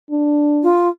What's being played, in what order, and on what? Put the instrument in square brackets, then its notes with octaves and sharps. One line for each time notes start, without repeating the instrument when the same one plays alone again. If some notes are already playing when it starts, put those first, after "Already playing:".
[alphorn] D4
[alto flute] F4